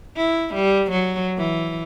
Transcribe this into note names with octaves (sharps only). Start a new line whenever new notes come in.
E4
G3
F#3
E3